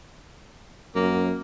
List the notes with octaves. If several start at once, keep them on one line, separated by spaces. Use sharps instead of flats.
F#2 A#3